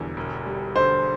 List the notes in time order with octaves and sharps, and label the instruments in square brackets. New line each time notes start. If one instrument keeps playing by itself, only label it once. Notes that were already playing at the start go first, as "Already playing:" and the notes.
Already playing: [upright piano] E1 E2 D3 G3
E1
G3
[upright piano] D3 [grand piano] C5